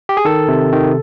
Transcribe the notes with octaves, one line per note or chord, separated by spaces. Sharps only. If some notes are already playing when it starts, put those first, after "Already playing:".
G4
G#4
D#3 A4
C3
D#3